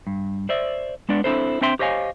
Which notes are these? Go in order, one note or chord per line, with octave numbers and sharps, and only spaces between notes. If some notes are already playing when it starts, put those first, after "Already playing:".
G2
C5 D5 E5
G#3 B3 D4 D5
C4 D4 E4 A4 C5
C4 D4 C5 E5 G5 C6
G4 C5 C#5 D#5 F5 G#5